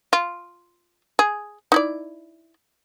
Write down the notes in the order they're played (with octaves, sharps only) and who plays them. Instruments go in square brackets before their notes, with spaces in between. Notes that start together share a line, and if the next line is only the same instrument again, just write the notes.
[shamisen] F4
G#4
D#4 E4 D5